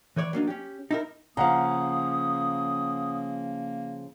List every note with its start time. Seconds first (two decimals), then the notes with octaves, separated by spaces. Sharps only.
0.16 E3 B4 C#5 D5
0.33 F#3 A#3 D4 D#4
0.47 C#4 G4
0.91 D#4 E4 A#4
1.37 C#3 F3 A#3 F5 F#5 A#5 D#6